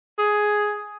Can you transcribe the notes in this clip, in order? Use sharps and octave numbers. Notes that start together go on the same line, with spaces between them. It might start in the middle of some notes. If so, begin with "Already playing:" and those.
G#4